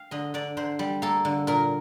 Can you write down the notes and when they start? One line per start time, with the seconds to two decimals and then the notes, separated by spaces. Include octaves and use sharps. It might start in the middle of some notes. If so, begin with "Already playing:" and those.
Already playing: F5 G5
0.11 D3 D#5
0.34 D3 D5
0.57 D3 C5
0.79 G3
1.02 A#3 A4
1.25 D3
1.47 A#2 A#4